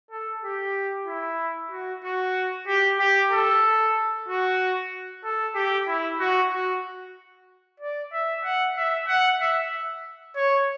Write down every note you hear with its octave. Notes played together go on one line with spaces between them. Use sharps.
A4
G4
E4
F#4
F#4
G4
G4
A4
F#4
A4
G4
E4
F#4
F#4
D5
E5
F#5
E5
F#5
E5
C#5